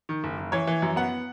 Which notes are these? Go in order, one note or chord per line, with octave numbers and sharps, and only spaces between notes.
D#3
F#1
F#1
E3 C#5
E3
F#2
B3 F#5